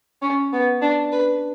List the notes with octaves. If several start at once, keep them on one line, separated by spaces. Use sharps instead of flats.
C#4
B3
D4
B4